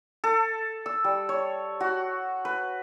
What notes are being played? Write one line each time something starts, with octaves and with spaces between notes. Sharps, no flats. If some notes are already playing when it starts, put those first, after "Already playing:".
A4
E6
G3
C#5
F#4
B4